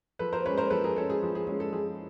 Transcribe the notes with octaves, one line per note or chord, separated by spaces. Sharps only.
F3 A4 B4
A#4 C5
G#3 C#4 B4 C#5
A#4 C5
F3 A4 B4
G#4 A#4
G#3 C#4 A4
G#4
F3 G#4
G#4
G#3 C#4 G#4
A4
F3 G#4